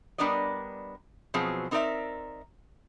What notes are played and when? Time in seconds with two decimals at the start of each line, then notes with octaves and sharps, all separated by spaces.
0.18 G3 B3 D4 A#4 D5 D#5
1.34 B2 F3 F#3 C4 G#4
1.71 C4 D#4 A#4 B4 D5 E5